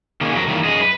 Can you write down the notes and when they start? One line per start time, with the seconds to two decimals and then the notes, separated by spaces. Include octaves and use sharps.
0.21 D#3 A#3 C#4 D#4 G#4
0.33 F2 F#3 A#4
0.47 D#3 E3 F#3 G3 A#3
0.64 F#2 G#4 D#5
0.82 B4